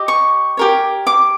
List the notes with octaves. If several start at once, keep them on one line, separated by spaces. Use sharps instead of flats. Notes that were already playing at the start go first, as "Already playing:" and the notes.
Already playing: G4 D#5
C#6
G4 A#4 C#5
D6